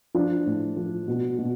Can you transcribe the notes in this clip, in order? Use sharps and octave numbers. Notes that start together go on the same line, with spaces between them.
F3 D4 F4
A2
F3
B2
B2